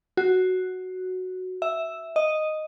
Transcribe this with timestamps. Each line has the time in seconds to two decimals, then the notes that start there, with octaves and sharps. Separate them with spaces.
0.17 F#4
1.62 E5
2.16 D#5